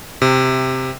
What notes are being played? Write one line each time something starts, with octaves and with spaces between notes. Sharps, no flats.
C3